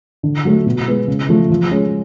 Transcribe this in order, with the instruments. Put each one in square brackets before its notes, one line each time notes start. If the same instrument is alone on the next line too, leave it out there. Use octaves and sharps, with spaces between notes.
[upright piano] D3
F#3 A3
B2
G#3 B3
C#3
F3 A3
F3
G#3 C#4